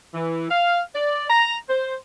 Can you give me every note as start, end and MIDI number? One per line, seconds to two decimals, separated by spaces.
0.14 0.47 52
0.51 0.81 77
0.95 1.25 74
1.30 1.56 82
1.69 1.95 72